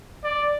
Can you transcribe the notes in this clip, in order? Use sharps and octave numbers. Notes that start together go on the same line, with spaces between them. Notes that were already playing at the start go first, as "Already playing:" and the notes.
D5